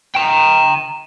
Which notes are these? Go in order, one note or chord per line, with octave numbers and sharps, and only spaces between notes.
G5 A#5